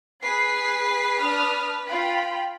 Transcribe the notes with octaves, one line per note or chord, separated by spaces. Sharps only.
G#4 B4 C7
D4 D#6 F6
F4 G5 B5